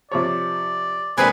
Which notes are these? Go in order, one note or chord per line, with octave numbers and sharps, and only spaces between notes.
C3 F3 C#5 D5
C3 G#3 A#3 D4 G#4 B4 G#5 B5